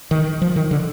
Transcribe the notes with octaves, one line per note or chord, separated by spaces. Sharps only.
D#3
F3
D#3
D3